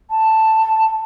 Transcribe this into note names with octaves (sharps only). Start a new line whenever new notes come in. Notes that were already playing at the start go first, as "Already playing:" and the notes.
A5